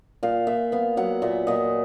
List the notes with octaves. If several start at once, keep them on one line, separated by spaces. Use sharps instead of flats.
A#2 F5
A#2 E5
B3 F5
F#3 F#5
A#2 E5
A#2 D#5